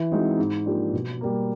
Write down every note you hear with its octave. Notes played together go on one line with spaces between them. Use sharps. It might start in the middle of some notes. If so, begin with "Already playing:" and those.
Already playing: E3
G#3 C4 D#4 F#4
G#2
F3 A#3 D4 G4
B2
G3 A#3